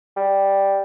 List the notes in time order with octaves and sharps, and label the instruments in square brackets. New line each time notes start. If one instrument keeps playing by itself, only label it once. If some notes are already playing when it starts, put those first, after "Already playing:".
[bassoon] G3